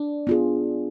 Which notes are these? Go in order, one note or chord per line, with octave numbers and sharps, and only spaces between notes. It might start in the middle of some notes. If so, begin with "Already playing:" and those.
Already playing: D4
B3 F4 G#4